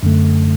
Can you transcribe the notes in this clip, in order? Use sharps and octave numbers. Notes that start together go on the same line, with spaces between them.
F#2 D3 A3